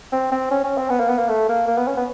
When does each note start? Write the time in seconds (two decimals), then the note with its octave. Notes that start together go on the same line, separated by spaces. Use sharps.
0.13 C4
0.32 C4
0.51 C#4
0.64 C#4
0.78 C4
0.90 B3
1.00 A#3
1.10 B3
1.19 A#3
1.29 A3
1.49 A#3
1.67 A#3
1.78 B3
1.88 C#4
1.97 B3